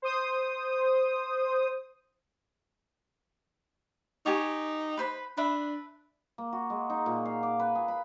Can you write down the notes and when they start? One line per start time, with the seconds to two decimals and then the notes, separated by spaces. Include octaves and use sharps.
0.02 C5 D#6
4.26 D#4 G4 G#5 C#6
4.97 B4 C5 B5
5.37 D4 B4 E5
6.38 A#3
6.53 F#4
6.70 G#3
6.90 D#4
7.06 A#2
7.26 F5
7.43 D6
7.60 B4
7.75 G#4
7.88 B5